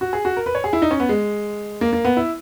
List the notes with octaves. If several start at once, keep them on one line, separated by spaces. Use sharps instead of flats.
F#4
G#4
F#4
A#4
B4
C#5
G#4
E4
D#4
C#4
B3
G#3
A#3
A#3
B3
E4